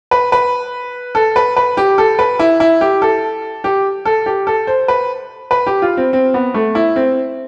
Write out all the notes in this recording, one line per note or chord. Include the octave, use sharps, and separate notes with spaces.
B4
B4
A4
B4
B4
G4
A4
B4
E4
E4
G4
A4
G4
A4
G4
A4
C5
B4
B4
G4
F4
C4
C4
B3
A3
E4
C4